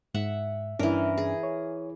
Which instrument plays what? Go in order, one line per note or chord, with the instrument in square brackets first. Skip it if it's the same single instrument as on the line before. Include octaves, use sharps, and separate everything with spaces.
[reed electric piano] G#2 [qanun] E5 F#5
[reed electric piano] G2 C#4 D4 [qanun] E3 A#4
[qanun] G#4
[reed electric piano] C#5